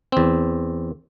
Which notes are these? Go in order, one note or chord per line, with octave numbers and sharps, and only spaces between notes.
E2 C4